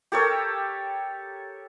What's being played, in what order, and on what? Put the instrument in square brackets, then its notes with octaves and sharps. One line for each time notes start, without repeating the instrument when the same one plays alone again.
[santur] G4 A4 A#4 C#5